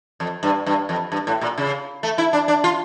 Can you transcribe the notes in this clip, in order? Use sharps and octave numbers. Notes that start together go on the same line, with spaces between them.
F2
G2
G2
F2
G2
A2
A#2
C#3
A3
E4
D4
D4
F4